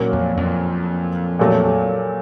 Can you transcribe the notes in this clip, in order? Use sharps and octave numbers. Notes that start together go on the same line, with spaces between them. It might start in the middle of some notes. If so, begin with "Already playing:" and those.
Already playing: A#2 F#3 A#3 C#4 F#4
F2
F2
A#2 F#3 A3